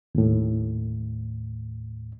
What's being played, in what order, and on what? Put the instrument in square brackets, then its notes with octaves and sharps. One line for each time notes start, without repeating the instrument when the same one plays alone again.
[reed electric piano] D#2 A2